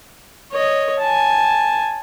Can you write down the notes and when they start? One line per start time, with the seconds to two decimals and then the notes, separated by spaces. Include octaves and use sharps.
0.52 C#5 D#5
1.00 G#5 A5